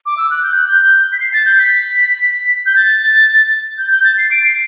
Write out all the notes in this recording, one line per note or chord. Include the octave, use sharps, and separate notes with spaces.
D6
E6
F#6
G6
F#6
G6
B6
C7
A6
G6
B6
G6
A6
G6
G6
A6
C7
D7
C7